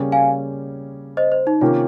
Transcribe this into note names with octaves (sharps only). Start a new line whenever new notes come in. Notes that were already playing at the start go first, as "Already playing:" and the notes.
Already playing: C#3 G3 A#3 C#4 G4
F5 G#5
C5 D#5
C5
D#4
C3 D#3 A#3 C#4 F4 G4